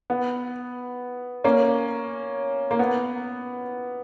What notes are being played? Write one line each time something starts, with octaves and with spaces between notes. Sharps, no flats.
B3
A#3 C#4
A#3
B3